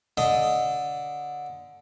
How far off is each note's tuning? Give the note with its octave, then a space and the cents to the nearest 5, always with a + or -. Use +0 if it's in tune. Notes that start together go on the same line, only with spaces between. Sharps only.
D3 -10 D#5 +0